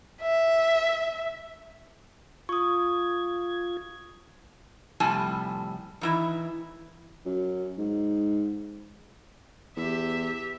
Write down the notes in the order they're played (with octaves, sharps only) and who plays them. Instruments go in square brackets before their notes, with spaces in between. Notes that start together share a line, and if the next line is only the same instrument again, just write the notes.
[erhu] E5
[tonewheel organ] F4 G#6 [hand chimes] C#6 D#6
[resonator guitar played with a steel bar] F2 A2 C3 G3 G#5 A5
D#3 E3 E4
[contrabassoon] F#2
G#2
[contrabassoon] E2 [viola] G4 E5